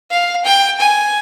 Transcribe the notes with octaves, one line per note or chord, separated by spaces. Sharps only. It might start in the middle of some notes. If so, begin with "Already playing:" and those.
F5
G5
G#5